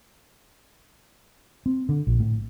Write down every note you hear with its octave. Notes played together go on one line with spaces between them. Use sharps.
C4
D3
A#1
A2